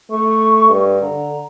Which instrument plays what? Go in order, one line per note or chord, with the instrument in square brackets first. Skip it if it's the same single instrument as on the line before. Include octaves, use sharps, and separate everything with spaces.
[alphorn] A3 [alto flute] C#6
[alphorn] G2
[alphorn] D3 [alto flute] A#5